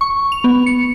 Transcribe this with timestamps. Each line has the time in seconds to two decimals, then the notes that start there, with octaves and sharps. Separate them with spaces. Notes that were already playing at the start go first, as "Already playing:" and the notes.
0.01 C#6
0.32 F7
0.44 B3
0.66 C#7